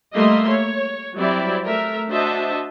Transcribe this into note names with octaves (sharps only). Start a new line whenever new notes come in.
G3 A3 A#3 D#5 E5 C6
C#5
F#3 G3 C4 E4 D5 E5
A3 A#4 E5
D4 F#4 C5 D#5 E5 A5